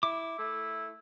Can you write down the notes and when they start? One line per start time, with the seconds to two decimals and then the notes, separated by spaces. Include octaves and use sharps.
0.03 E4 D6
0.38 A3 E4